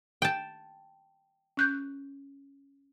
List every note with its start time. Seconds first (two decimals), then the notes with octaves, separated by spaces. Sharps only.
0.22 G5 A5
1.57 C#4 F#6 G6